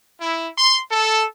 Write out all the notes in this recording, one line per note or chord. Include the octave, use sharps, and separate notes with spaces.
E4
C6
A4